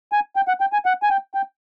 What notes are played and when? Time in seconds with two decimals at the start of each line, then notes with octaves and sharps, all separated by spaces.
0.12 G#5
0.36 G5
0.48 F#5
0.61 G5
0.73 G#5
0.86 F#5
1.03 G#5
1.10 G5
1.34 G5